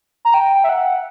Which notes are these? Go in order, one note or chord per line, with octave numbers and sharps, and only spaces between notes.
A#5
G5
E5
F#5